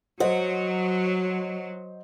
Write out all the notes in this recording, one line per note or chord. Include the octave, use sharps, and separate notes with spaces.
F#3 F#4 C5 D#5